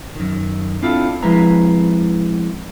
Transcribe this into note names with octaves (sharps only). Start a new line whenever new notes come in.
F#2 D#3
C4 D4 E4 F4 A4
F3 G#3 C4 E4 B4 A#5